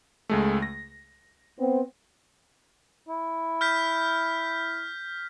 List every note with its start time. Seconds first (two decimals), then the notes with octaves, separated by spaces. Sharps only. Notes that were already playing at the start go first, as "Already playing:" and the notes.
0.29 C#2 G#3 A3
0.62 A#6
1.59 B3 C4
3.09 E4
3.61 F6 G6 B6